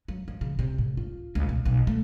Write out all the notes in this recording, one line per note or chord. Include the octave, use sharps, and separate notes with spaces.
F#3
F3
C#3
C3
A2
F4
C#2
B1
B1
A3